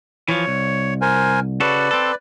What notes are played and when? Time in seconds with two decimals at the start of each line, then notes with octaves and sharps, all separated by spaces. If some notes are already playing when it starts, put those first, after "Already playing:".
0.28 E3 F3 C#5
0.47 C2
1.02 A#4 C5 G#5
1.60 C#3 F#4 A4 B4 D5
1.91 C4 A4